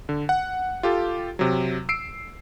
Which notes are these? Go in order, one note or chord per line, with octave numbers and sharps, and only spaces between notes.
D3
F#5
F4 G4 A4
C3 F#3
E6 C7 D7